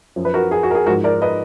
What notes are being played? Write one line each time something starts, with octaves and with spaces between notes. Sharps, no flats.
F#2 F3
B4
F#4 A#4
G#4
F#4
A#4
G#4
G#2 F3 F#4 A#4
A#4 D5
B4 D#5